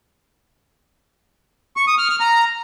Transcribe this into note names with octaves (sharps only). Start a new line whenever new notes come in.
C#6
D#6
F6
F6
A#5